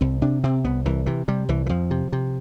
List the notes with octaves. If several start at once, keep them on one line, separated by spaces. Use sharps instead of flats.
C2 C4
C3 D4
C3 C4
C2 B3
C2 E3
C3 E3
C3 G3
C2 E3
E3
F2 F3
C3
C3